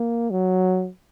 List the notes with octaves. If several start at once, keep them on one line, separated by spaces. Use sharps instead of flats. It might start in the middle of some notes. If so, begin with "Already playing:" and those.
Already playing: A#3
F#3